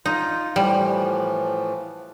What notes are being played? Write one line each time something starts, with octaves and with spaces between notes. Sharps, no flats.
D#4 F4
A2 E3 F3 G3